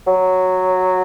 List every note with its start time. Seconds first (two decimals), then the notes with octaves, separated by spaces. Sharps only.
0.07 F#3